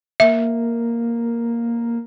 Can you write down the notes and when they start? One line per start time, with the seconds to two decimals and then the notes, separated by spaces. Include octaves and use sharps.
0.20 A#3 E5